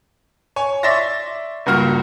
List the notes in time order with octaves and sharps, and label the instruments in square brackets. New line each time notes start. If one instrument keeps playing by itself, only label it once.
[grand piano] C#5 G#5
D5 E5 C6 C#6 A6 A#6
C#2 G2 A#3 F#4 F6